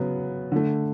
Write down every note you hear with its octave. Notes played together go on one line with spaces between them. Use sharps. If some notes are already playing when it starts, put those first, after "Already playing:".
Already playing: C#3 F#3 B3
D3 A3